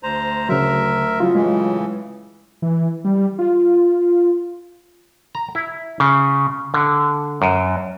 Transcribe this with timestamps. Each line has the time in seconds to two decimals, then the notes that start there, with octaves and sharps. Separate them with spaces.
0.03 D2 C5 A#5
0.49 D2 C#3 F#3 A#4 E5
1.20 C#3 F#3 E4 F4
1.35 A2 C#3 E3 G#3
2.62 E3
3.05 G3
3.39 F4
5.35 A#5
5.55 E4
6.00 C#3
6.74 D3
7.42 F#2